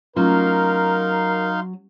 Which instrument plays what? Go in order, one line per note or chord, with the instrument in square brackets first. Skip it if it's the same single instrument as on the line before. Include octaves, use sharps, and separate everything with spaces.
[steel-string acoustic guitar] F#3 [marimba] A3 C#4 F4 [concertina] D#4 F5 C6 [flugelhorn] A#4